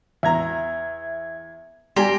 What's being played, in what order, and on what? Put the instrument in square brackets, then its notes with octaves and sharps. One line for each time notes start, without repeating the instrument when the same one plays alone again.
[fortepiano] E2 A#5 [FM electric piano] E5 G#6
[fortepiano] G3 [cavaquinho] G4 A#5 [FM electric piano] G#5 C6